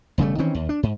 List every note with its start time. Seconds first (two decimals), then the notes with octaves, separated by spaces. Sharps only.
0.18 E1 C#3 G3 A3
0.38 D#3 E3 C4 C#4
0.55 D#2
0.69 D4
0.83 G#2